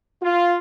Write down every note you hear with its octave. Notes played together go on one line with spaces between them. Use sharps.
F4